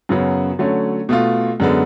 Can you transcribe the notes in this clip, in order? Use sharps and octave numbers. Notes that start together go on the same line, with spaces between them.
F#2 C#3 F#3 B3 F#4
D3 F#3 A3 C#4
B2 A3 F4
F#2 D3 G#3 B3